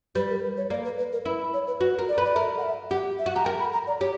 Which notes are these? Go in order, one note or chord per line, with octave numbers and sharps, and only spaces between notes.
G3 B4
A#4
B4
C#5
A#3 D5
B4
B4
A#4
E4 B4
C#5
B4
F#4 B4
A#4
D5
B4
D5
A#4 E5
F#5
E5
G4 F#5
E5
F#4
G4 A#5
A#4 G5
B5
A#5
D5
G4 C#5